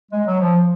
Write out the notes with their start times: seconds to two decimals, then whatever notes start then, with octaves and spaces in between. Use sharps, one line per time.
0.11 G#3
0.26 F#3
0.40 F3